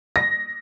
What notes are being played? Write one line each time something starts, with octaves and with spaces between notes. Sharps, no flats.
A#6